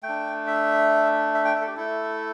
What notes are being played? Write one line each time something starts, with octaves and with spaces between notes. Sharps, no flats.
A3 G5
D4
E5
E5
G5
E5
A4
G4
A3 E4 A4